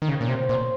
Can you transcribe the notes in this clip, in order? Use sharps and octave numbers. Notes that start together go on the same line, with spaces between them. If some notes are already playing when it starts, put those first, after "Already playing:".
D#3
C#3 C#5
A#2
C3 C5
C#5
A#2 C5